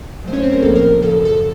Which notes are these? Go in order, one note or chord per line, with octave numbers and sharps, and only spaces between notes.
D#2 C#3 F#3 A3 C5
C#4 C#5
C4 C5
A#4
A#1 A2 F3 A#3 A4
A#4
F#2 C#3 F3 A4
A4